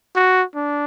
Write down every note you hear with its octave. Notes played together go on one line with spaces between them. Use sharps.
F#4
D4